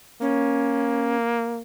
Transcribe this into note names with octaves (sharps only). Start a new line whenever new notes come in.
A#3 C#4